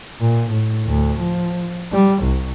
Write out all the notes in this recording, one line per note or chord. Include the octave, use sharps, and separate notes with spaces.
A#2
A2
D2
F3
G3
C2